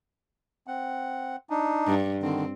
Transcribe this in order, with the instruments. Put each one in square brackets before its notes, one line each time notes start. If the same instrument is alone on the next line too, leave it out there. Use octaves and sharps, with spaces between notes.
[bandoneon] C4 F#5
D4 D#4
[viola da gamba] G2
[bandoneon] D3 D#3 [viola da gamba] C4